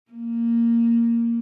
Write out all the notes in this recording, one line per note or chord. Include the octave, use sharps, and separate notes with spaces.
A#3